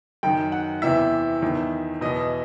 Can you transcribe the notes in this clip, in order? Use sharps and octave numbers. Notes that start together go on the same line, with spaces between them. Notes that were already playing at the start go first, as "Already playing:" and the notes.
F#2 D#3 G5
F#5
E2 C3 E3 E5
E2 D#3
E2 B2 D#5